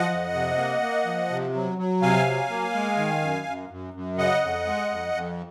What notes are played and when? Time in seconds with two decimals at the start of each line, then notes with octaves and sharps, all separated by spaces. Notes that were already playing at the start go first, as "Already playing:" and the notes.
Already playing: F3 D#5 F#5
0.10 F2
0.33 C3
0.58 A#3
0.82 A#3
1.05 F3
1.30 C3
1.54 F#3
1.78 F#3
2.02 C3 F5 G#5
2.26 F#3
2.50 A#3
2.74 G#3
2.97 D#3
3.22 F#2
3.46 F#2
3.70 F#2
3.94 F#2
4.18 C#3 D#5 F#5
4.42 F2
4.66 G#3
4.90 F2
5.14 F2